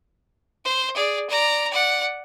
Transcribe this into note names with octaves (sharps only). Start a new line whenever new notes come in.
C5
G#4 D5
D5 A#5
D5 F#5